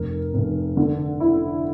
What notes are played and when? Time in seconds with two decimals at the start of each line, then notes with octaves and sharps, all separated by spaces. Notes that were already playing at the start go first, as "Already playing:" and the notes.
Already playing: F1 A#4
0.34 F1
0.77 D3
1.20 E4